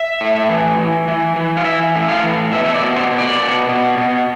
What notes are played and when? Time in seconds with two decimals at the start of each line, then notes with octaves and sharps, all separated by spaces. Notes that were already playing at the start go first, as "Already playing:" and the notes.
Already playing: E5
0.20 A2
0.49 E3
0.79 E3
1.08 E3
1.36 E3
1.57 F5
1.65 E3 E5
1.95 A2
2.09 F5
2.23 E3
2.53 B2 E5
2.65 E5
2.74 D5
2.82 B2
2.96 C5
3.11 B2
3.18 D5
3.40 B2
3.69 B2
3.98 B2